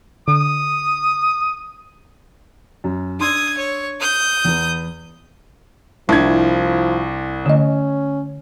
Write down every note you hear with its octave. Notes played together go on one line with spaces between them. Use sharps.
D3 D#6
F#2
D4 C6 D#6 E6 G#6
C#5
D#6 G6
E2 B3
C2 F3 D4 E4 A5 G#6
D3 A3 C#4 D#5